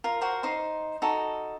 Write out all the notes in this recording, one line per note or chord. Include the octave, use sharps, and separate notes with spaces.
F4 A#4
F#4 A#4 C5
D#4 C5 C6
D#4 F#4 A4